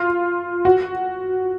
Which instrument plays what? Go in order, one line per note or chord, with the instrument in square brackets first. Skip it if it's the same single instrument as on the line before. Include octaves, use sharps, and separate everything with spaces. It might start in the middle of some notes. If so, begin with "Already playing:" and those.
Already playing: [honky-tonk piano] F4
F#4